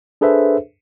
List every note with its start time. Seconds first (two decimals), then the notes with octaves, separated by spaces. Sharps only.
0.21 D4 G#4 A4 B4 C5 E5